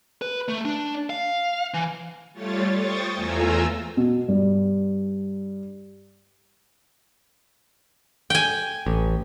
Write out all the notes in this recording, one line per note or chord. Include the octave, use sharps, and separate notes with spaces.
B4
A3
D4
F5
E3
G3 A3 F4 C#5 A6
C5 G5 C#6 D#6 A6
E2 A3 F4 G#5 A#5 E6
B2
G2
G5 G#5
A1